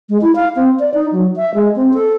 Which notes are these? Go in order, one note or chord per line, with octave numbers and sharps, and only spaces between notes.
G#3
E4
F5
C4
D5
D#4
F#3
E5
G#3
C4
A4